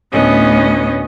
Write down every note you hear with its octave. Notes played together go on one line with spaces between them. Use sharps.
D2 A2 B3 C#4 D#5